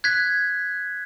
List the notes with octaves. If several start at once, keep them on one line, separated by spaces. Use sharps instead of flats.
F#6 G#6 B6